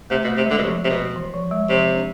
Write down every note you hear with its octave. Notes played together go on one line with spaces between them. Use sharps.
C3 A3
B2
A3
C3
D3 G#3
B2
C3 F3
C3
B2
E3
F3
G#3
C3 F3
D4